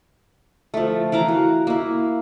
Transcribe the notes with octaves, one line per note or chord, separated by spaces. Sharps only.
F3 A3
E3 A#4 F5 A#5
F#4
A#3 E4